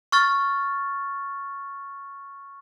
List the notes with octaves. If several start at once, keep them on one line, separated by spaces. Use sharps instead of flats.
C#6 F6 A6